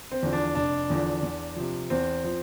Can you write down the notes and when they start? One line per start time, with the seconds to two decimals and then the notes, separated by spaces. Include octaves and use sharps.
0.11 C4
0.23 E2 D3 F3
0.33 D4
0.55 F1 D4
0.90 E2 D3 F3
1.23 E2
1.56 C3 F3
1.90 E2 C4
2.24 F3